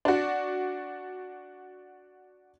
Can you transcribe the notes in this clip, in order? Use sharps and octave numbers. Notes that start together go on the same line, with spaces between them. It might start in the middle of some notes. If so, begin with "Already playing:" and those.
D4 F#4